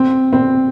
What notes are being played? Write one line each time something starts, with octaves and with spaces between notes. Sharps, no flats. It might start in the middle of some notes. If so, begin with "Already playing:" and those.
Already playing: C4
C4